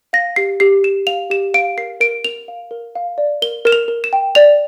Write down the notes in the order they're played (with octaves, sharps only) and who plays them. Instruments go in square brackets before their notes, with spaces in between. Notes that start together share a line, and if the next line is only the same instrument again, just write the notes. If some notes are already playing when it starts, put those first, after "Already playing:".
[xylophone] F5 A#6
G4 C7
G4 C7
G4 E7
F5 F7
G4 E7
F5 D7
A#4 C7
A#4 D7
A#4 F7
F5
A#4
F5
D5
A#4 G7
A#4 E7
F7
A#4
E7
G5
D5 F7